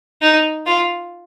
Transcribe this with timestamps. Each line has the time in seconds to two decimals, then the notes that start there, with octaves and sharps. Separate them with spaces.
0.22 D#4
0.67 F4